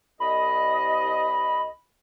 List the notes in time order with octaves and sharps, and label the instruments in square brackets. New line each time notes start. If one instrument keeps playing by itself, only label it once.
[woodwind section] C2 D#5 [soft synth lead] B5